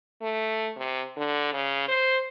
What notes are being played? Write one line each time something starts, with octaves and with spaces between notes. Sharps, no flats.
A3
C3
D3
C#3
C5